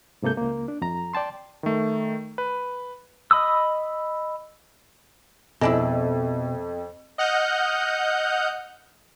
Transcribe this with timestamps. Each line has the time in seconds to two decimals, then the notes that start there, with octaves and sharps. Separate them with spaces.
0.22 G#2 C3 A#3 A4 G6
0.37 C#2 A#3
0.68 D4
0.82 F2 A#5
1.14 D5 G5 A5 C6
1.63 D#3 A3
2.38 B4
3.31 D#5 B5 D#6 E6
5.61 F2 B2 G#3 D4 E4
7.18 D#5 F#5 F6 G6